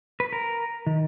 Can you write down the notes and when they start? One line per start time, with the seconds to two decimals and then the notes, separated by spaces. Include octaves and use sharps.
0.20 B4
0.33 A#4
0.87 D#3